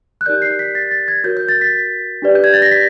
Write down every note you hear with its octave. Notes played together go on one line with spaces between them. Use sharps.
F#6
D#4 G4 A#4 D5 G6
C7
B6
A6
A6
G#6
F#4 A#4 C#5 G6
G6
A6
B6
D4 G4 B4 D5
G6
G#6
A6
A#6
B6